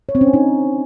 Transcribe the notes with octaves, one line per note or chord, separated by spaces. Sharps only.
C#5
C4
C#4
D4
D#4